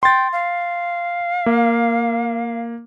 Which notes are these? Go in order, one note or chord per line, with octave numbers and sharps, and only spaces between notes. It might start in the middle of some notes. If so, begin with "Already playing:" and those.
G5 C6 A6
F5
A#3